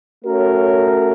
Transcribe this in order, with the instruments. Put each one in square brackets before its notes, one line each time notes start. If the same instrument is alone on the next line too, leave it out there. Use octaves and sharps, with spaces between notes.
[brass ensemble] A3 C#4 F#4 A#4 C#5